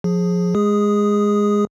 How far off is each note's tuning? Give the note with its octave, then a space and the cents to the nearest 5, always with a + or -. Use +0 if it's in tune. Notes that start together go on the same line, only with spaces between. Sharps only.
F3 +25 G#4 +0
G#3 +0 G#4 -20 D#6 +0